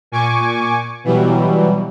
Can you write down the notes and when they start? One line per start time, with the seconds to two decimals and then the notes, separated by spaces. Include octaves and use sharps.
0.12 A#2 G#5 C#6 D6
1.04 B2 E3 F#3 G3